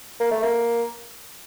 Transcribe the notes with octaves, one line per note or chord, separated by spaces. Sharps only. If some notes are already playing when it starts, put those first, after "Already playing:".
A#3
A3
A#3